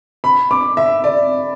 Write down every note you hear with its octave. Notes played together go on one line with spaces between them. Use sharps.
B5
D6
E5
D5